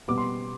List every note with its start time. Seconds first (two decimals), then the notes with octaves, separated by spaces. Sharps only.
0.08 B2 G3 B3 D6
0.18 C6